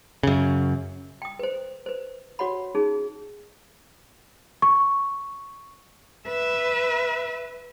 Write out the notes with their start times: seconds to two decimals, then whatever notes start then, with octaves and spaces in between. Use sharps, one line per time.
0.23 F#2 C#3
1.22 G5 D#6
1.39 B4 C5
1.86 B4 C5
2.39 F#4 C#5 F#5 B5
2.75 C#4 D#4 G#4
4.62 C#6
6.27 B4 E5